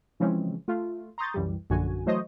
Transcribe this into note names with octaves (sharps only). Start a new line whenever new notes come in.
C#3 E3 F3 G#3 C4 C#4
A3 F4
A#5 C6 C#6 D#6 G6 A6
C2 F#2 E3 G3
A#1 F#2 D3 F#4 G#5
E3 F#3 A3 C5 C#5 D#5